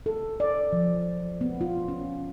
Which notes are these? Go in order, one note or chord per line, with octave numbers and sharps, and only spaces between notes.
A4
D5
F3
B3
F4
C#4